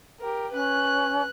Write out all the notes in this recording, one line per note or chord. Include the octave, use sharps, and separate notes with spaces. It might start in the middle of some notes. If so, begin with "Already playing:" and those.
G4 A#4
C#4 B4 F#6